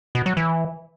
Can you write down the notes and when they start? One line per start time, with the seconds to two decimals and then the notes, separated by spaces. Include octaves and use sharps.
0.15 B2
0.26 F#3
0.37 E3